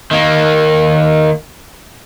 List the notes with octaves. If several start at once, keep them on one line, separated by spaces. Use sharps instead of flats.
D#3 A#3